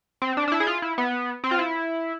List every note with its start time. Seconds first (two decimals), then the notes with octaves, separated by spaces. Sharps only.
0.22 C4
0.37 D4
0.48 D4
0.52 E4
0.60 G#4
0.67 F4
0.82 E4
0.98 B3
1.44 C4
1.51 F4
1.59 E4